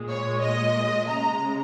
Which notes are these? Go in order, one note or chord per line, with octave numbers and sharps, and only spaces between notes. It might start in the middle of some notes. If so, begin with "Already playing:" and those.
Already playing: A#2 G#3
C#5
D#5
C#3 G#3 A#5